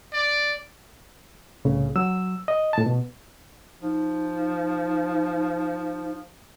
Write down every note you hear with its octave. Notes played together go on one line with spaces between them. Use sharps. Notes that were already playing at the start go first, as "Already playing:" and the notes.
D5
C2 A2 C#3
F#3 E6
D#5
A2 A5
B2
F3 D#4